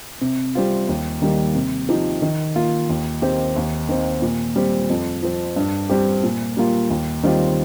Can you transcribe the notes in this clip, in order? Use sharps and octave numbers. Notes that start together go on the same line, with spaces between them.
C3
G3 C4 F4
D#2
D#3 G3 A#3
C3
F3 D#4 G4
D#3
A#3 F4
D#2
D#3 C4 G4
D#2
D#3 C4
A#2
G3 C4
F2
F3 C4
G2
G3 C4 G4
A#2
G3 A#3 F4
D#2
D#3 G3 C4 F4